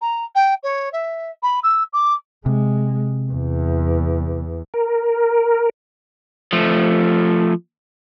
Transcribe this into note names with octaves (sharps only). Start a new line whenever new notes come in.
A#5
G5
C#5
E5
B5
E6
D6
C3 G#3
E2
A#4
F3 A3